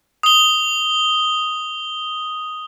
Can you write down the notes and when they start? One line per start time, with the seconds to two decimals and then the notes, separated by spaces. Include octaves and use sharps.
0.23 D#6 G7